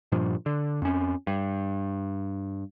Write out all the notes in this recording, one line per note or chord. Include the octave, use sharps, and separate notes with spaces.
G2 A#2 F3
D3
F2 C#4
G2